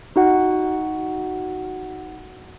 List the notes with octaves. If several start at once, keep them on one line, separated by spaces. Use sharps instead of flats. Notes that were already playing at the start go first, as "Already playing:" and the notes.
D#4 F#4 F#5